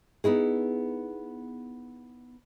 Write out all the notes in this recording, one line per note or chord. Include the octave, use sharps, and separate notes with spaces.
B3 D#4 E4 G#4